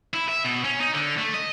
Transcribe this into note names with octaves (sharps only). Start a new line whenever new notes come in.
E4
E5
B2
C#4
D#4
D3
A3
D#5